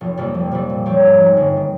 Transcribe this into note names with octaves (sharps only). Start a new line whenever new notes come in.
F1
F2 C3 G3 A#3
F1
F2 C3 G3
A#2
F3 C4 G4 C#5
G#2
F3 G#3
G1
D#3